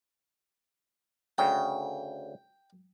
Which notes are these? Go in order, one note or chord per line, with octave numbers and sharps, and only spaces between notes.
D2 C#3 G5